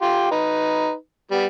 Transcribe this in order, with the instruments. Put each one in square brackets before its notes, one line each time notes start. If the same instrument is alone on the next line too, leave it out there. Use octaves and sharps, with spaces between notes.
[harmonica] F4 G4 C6
D#4 B4
G3 B3